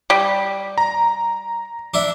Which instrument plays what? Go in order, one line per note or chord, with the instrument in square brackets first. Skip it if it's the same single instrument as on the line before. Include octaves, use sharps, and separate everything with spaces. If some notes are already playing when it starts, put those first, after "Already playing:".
[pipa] G3
[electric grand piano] A#5
[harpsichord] D4 E4